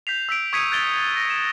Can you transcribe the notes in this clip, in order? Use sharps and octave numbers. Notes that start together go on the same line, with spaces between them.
G6 B6 C7 F7
E6 B6 D7
C#6 D#6 G#6 B6 C#7 D#7
F#6 G#6 A6 D7 G7
A#6
E7